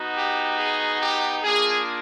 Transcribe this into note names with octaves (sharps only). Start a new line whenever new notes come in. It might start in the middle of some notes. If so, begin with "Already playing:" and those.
Already playing: B3 D#4 F#4
G4
G#4
G4
A#3 D4 F4 G#4